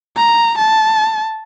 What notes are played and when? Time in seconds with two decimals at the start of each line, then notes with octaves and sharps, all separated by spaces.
0.16 A#5
0.58 A5